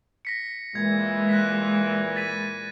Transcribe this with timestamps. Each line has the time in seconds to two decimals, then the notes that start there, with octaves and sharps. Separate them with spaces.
0.25 A#6 B6 C#7
0.75 A#2 E3 G#3 G#6
1.29 F#6 A#6 B6
2.16 A6 B6 D#7